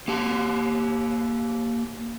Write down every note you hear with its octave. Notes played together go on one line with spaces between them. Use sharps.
A#3 G4 A5